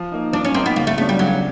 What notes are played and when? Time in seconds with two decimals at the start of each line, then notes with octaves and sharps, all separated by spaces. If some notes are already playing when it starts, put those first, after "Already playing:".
Already playing: F3
0.12 A#3 D#4
0.33 F3 D4
0.45 C#4
0.54 A#3 C4 D#4
0.66 B3
0.76 C#2 A#3
0.87 A3
0.98 C#3 F#3 A3 B3 D4
1.09 G3
1.19 C#2 F#3